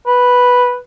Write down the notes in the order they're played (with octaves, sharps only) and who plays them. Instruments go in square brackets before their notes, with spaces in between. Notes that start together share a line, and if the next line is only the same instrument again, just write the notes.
[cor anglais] B4